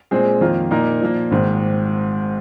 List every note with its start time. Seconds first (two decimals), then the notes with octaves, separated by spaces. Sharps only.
0.11 A#2 G#3 C4 G#4 C5
0.41 F2 D#3 A#3 F4
0.71 A#2 A#3 D#4 A#4
1.01 A#2 F3 A#3
1.31 G#1 G#2 D#3